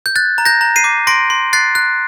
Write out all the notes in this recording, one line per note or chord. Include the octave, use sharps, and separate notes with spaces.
G6
F#6 A6
A#5
G6 A#6
A#5
C7 D#7
D6
C6 A#6 D7
C6
F#6 A6 C7
F#6